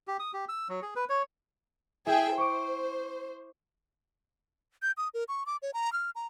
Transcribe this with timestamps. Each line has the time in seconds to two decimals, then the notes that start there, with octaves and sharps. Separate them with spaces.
0.08 G4
0.19 D#6
0.33 G4
0.49 E6
0.69 F#3
0.82 G#4
0.96 B4
1.09 C#5
2.07 E4 G#4 E5 G5
2.38 C5 C#6 D6
4.82 G6
4.97 D#6
5.14 A#4
5.28 C#6
5.46 D6
5.62 C#5
5.74 A#5
5.93 F6
6.15 A#5